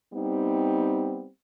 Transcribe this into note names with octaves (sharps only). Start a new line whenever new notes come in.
G3 B3 C4 D#4